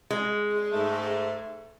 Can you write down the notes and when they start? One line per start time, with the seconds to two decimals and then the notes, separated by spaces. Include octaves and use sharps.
0.10 G#3
0.73 G#2 A3